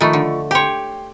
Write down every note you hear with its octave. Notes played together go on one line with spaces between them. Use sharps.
D#3 F3 A3 B5 C#6
D3
G4 C#5 G5 C6